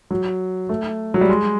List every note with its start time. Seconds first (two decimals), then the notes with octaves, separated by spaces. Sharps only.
0.11 F#3
0.69 A3
1.14 F#3
1.21 G3
1.29 G#3